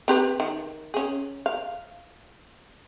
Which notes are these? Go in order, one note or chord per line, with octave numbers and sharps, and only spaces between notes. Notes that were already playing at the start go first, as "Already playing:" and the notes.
C4 G4 B4
D#3
C#4 G#4
F5